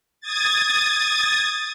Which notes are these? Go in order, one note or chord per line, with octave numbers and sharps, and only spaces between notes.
D#6 G#6 A6